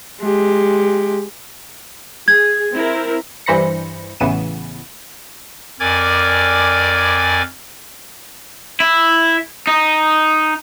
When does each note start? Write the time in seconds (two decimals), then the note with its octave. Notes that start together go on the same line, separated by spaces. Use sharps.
0.21 G#3 G4
2.28 G#4 G#6
2.72 C4 E4 A#4
3.46 G2 E3 C5 B5 A#6 C#7
4.20 A1 C#3 E3 B3 D#7 E7
5.80 F2 A#4 D5 G#5 D6 G#6
8.80 E4
9.67 D#4